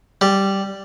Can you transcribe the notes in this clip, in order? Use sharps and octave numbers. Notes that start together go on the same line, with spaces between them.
G3